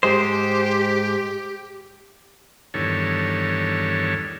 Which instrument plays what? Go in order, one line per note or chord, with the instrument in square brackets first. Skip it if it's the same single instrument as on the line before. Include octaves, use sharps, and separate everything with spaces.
[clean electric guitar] G#2 G#3 C5 [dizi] G4
[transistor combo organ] E2 G2 D#3 A4 C#5